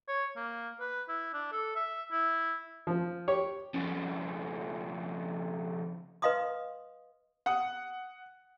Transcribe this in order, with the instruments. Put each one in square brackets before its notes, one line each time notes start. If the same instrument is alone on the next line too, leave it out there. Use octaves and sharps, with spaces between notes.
[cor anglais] C#5
A#3
B4
E4
D4
A4
E5
E4
[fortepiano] F3
G4 C#5
[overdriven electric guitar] F2 C#3
[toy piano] B4 D#5 F5 C6 D#6
[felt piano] F#5 D#6